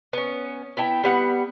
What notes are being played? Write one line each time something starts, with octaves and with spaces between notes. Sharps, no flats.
B3 C#4
B3 E4 G5 A5
G3 B3 F#5